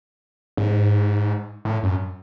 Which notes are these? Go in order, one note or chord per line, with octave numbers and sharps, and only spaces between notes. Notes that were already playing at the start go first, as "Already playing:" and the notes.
G#2
A2
F#2